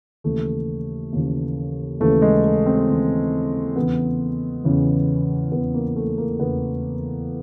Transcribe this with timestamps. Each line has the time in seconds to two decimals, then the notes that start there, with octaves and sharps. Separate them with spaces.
0.24 D#2 C#3 E3 A3
1.13 D#2 C#3 E3
2.00 D#2 C#3 E3 A3
2.22 G#3
2.44 A3
2.66 C4
2.88 D#2 C#3 E3
3.76 E2 C#3 E3 B3
4.64 E2 C#3 E3
5.52 E2 C#3 E3 B3
5.74 A#3
5.96 A3
6.18 A#3
6.40 E2 C#3 E3 B3